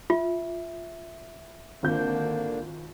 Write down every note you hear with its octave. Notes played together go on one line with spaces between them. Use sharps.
F4 E5
G#1 D3 A#3 D4 F4 G6